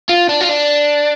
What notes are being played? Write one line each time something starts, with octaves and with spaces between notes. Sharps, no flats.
F4
D4
F4
D4